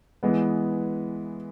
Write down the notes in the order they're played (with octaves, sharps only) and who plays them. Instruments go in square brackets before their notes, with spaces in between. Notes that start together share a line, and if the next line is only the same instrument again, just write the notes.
[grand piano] E3 G#3 B3